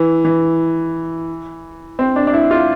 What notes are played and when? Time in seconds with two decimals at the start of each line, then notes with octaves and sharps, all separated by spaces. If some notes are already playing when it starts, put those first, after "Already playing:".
Already playing: E3
0.25 E3
1.99 C4
2.16 D4
2.27 D4
2.33 E4
2.51 F4